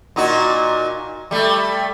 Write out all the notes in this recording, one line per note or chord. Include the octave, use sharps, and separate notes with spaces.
A#2 D#4 F#4
G3 A3